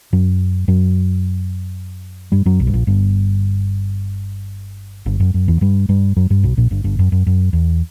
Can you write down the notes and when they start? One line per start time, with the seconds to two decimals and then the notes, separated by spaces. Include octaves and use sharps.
0.13 F#2 F#3
0.68 F#2 F#3
2.32 G2 G3
2.45 F#2 F#3
2.60 B1 B2
2.67 G2
2.74 A#1 A#2
2.87 G1 G2
5.06 G1 G2
5.20 F#2
5.34 F#2
5.48 E2 E3
5.61 G2 G3
5.89 G2 G3
6.16 F#2 F#3
6.30 G2 G3
6.43 B1 B2
6.57 A#1 A#2
6.71 G1 G2
6.84 G1 G2
6.99 F#2
7.12 F#2
7.27 F#2
7.53 E2